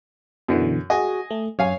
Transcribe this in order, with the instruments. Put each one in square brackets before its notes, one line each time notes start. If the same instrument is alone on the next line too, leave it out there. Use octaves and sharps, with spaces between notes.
[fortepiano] F#2 [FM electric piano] B2 D3 E3
[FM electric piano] F#4 G#4 [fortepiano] D#5 G#5
[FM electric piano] A3
[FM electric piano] F#2 [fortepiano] C#5 F5 G#5